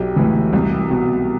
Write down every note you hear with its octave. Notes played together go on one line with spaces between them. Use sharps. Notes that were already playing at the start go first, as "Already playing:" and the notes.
Already playing: B1 G4
A2 E3
C2
B2